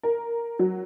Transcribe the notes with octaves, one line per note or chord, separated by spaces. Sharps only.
A#4
F#3